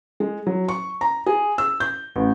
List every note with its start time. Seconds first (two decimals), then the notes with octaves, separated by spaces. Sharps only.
0.20 G#3
0.47 F#3
0.68 C#6
1.01 A#5
1.26 G#4
1.58 E6
1.80 G6
2.16 A1